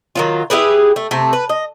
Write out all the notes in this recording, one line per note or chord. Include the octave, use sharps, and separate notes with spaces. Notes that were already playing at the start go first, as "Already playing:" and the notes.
D#3 F#3 F4
E4 G4 G#4 B4
A3
C3 A3
B4
D#5